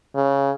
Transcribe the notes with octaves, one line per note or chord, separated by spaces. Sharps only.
C#3